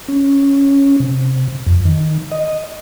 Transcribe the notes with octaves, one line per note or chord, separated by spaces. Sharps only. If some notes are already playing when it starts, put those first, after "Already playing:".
C#4
C3
F2
D#3
D#5